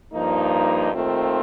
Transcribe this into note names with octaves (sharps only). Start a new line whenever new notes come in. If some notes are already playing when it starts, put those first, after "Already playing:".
G2 F3 A#3 D#4
D#2 D#3 A3 C4 F4